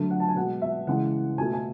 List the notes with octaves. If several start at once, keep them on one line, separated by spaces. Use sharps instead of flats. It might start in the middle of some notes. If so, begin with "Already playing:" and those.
Already playing: D3 F#3 A3
F#5
A5
G#5
B2 G#3 F#5
E5
C#3 E3 G#3 F#5
B2 A3 G#5
G#5